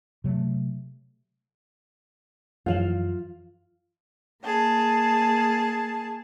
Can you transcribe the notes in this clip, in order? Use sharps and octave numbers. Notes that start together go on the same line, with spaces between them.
C3 F#3 G#3 A3
F#2 E3 F3 F4 F5
A#3 G#4 A5